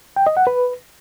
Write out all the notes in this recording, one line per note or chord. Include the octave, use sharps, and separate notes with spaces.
G5
D#5
F#5
B4